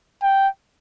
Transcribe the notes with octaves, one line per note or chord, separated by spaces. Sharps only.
G5